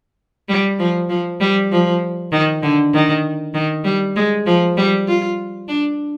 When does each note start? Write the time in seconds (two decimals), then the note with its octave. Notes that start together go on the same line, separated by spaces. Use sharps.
0.49 G3
0.79 F3
1.09 F3
1.41 G3
1.72 F3
2.32 D#3
2.63 D3
2.94 D#3
3.54 D#3
3.85 G3
4.16 G#3
4.46 F3
4.77 G3
5.07 F4
5.68 D4